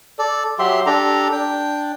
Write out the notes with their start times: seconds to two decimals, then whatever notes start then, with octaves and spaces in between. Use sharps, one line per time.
0.19 A4 D5
0.59 F#3 G4 E5 C6
0.86 D4 G4 A4 A#5
1.32 D4 G5